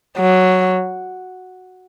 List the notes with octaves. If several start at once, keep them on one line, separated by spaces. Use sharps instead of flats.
F#3